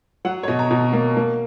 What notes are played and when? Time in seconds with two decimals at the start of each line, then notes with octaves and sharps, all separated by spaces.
0.25 F#3 F#5
0.43 C#5
0.48 B2 D#5
0.59 A#5
0.71 B2
0.93 A#3
1.17 A#3